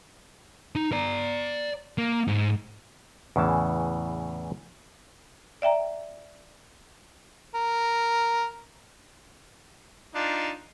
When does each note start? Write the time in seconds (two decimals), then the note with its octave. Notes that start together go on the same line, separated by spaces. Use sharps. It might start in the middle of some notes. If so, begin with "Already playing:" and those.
0.76 D#4
0.92 D5 A#5
1.98 A#3
2.28 G#2
3.36 E2 A2 C#3 E3 A5
5.62 D5 E5 G5 A#5
7.55 A#4
10.15 D4 D#4 F4